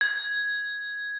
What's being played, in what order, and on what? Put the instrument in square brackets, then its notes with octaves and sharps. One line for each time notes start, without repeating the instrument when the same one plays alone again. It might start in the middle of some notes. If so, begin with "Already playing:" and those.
[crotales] G#6